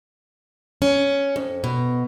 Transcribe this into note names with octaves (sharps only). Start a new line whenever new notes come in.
C#4
F2
B2